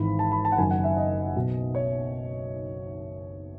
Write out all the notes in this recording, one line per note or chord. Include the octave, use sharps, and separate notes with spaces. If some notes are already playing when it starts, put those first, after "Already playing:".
Already playing: G#1 G#2 E3 B5
A5
B5
A5
F#5
F#1 F#2 D#3 G#5
F#5
E5
D#5
B1 B2
C#5